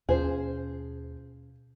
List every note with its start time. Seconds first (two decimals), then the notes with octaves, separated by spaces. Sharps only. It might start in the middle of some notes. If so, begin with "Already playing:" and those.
0.09 D#2 B2 F3 C#4 G#4 C5